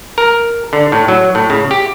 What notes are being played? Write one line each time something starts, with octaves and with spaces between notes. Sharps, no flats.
A#4
D3
A2
F#3
A2
C#3
G4